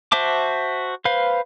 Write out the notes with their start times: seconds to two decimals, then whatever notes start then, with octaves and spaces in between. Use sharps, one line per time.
0.12 F#4 C5 E5 A5 D6
1.05 B4 C5 F5